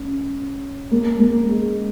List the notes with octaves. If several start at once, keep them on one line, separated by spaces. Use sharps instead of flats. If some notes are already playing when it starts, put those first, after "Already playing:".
Already playing: C#4
A#3
A#3
G#3